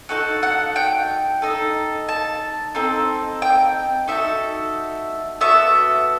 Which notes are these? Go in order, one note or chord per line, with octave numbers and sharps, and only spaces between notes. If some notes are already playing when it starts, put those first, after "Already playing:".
D#4 F#4 A4 F#5
F#5
G5
D#4 A4
A5
C4 D#4 A4
G5
D#4 F#4 A4 E5
B3 F#4 A4 E5